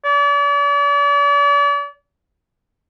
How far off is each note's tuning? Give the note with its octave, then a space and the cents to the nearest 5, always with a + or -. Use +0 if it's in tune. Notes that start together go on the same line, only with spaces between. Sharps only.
D5 -40